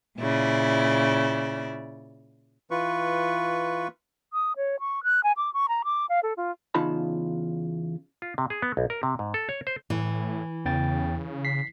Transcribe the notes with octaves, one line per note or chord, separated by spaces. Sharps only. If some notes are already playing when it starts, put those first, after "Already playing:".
A#2 C#3 E4 D5
E3 F4 B4 C#6
D#6
C#5
C#6
F#6
G#5
D6
C#6
A#5
D6
F5
A4
F4
E2 C#3 D#4 F4 A5 B5
F4
C3
G#4
B3
B1
A#4
C3
G#2
A4
C#5
C5
A2 E3
E2 C#3 G5 A6
B6 C7